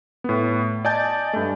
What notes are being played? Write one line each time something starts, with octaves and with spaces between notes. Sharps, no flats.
A2 B3
D5 D#5 G#5 A5 G6 A6
G2 A3